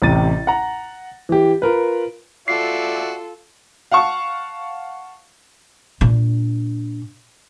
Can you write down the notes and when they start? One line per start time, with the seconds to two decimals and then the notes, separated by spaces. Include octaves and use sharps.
0.02 A1 A2 C3 A6 D#7
0.47 F#5 A#5
1.29 E3 G4
1.62 F4 A#4 B4
2.48 F4 F#4 A4 D5 E5 C7
3.91 F5 F#5 A5 C#6
6.01 A#2 D4